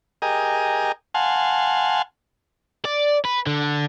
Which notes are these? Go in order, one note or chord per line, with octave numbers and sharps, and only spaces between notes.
G4 G#4 A#4 D#5
F5 F#5 G#5 A5 C6
D5
B4
D3